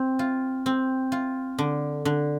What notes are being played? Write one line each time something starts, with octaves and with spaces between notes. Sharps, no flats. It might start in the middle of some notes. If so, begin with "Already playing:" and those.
Already playing: C4
F4
C4
F4
D3
D3